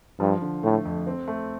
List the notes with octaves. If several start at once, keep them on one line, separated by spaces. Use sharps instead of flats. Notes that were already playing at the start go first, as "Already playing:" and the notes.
G2 F3
D3
A2 A3
F2
C4
A3